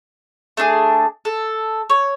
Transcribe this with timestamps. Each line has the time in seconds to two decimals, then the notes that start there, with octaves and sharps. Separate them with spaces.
0.57 A3 D4 D#4 G#4
1.25 A4
1.90 C#5